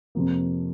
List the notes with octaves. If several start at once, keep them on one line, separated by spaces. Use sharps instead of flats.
F2 C3 F3 A#3